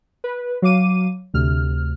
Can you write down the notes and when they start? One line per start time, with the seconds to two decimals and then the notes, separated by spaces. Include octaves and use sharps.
0.24 B4
0.62 F#3 F5 D6 D#7
1.34 D2 C3 F6